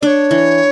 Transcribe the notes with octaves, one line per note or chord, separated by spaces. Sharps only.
D4 C#5 D5
E3